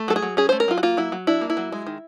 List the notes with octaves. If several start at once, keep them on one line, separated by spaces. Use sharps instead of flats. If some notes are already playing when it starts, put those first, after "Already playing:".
Already playing: A3
F#3 A4
G#4
F#3
C#4 G#4
A3 C5
A#4
F#3 F4
F#4
A#3 F4
F#3 E4
F#3
D4 E4
A#3
E4
F#3
G#3
D#3